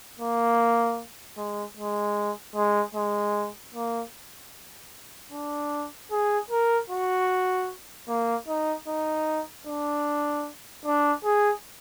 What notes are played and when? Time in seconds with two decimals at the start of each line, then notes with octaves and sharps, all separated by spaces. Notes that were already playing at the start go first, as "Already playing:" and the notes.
0.20 A#3
1.37 G#3
1.77 G#3
2.55 G#3
2.95 G#3
3.74 A#3
5.32 D4
6.11 G#4
6.51 A#4
6.90 F#4
8.08 A#3
8.48 D#4
8.88 D#4
9.67 D4
10.86 D4
11.24 G#4